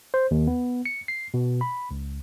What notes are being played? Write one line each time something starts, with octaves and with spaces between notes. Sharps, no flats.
C5
D#2
B3
C#7
C7
B2
B5
C#2